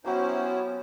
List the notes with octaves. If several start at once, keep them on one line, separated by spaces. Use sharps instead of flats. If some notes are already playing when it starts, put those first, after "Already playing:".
F#3 B3 C#4 E4 F#4 G4 C5 A#5